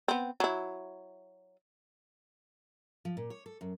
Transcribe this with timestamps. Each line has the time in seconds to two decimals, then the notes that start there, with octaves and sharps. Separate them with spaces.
0.08 B3 C4
0.40 F#3 E4
3.05 F3
3.17 A#2
3.30 C#5
3.46 A4
3.61 F#2